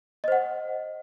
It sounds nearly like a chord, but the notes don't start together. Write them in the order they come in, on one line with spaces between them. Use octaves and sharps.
D#5 C5 F#5